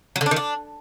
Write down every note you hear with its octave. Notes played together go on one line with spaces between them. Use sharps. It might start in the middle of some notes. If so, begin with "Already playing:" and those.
F#3
D3
D4
D#3
D4